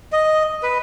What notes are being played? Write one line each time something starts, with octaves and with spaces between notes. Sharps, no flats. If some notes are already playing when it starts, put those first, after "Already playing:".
D#5
B4